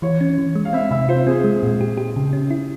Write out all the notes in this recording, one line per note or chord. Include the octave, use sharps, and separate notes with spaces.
E3 C#5
C#4
E3
G#3
F5
C4 E5
C3 E5
F4 C5
C4 G#4
G#3
A#2
G4
G4
C#3
C#4
E4